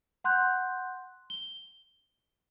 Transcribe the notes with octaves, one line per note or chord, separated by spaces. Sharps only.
F#5 C6 F#6 G6
G7